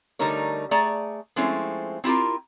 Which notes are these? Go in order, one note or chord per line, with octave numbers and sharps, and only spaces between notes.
D3 G3 A3 D#4 A#4 C#5
A3 G#4 D5 A#5
F3 G#3 A3 C4 C#4 E4
C4 E4 F4 G4 A#4